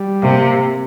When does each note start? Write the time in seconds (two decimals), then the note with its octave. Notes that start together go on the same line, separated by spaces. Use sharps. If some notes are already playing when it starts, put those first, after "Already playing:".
Already playing: G3
0.22 C3 A#3